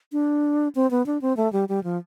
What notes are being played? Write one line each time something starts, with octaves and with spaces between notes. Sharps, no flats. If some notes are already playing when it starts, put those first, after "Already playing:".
D4
C4
B3
D4
C4
A3
G3
G3
F3